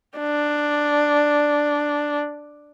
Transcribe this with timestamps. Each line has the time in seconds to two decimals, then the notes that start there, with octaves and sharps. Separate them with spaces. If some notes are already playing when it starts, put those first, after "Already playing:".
0.18 D4